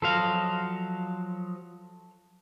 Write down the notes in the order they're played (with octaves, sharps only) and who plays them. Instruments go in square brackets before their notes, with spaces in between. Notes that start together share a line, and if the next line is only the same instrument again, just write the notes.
[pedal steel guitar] F3 F#3 D#5 [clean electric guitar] A4 C5 F5